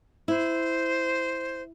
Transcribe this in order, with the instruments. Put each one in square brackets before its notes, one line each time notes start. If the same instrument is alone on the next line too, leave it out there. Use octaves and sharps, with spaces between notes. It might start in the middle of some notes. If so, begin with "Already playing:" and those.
[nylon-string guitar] E4 [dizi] C5